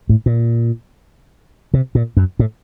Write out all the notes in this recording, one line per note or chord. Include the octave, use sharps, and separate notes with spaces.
A2
A#2
C3
A#2
F#2
A2